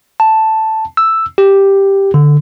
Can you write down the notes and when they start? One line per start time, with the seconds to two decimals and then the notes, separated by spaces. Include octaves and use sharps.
0.20 A5
0.97 E6
1.38 G4
2.14 D3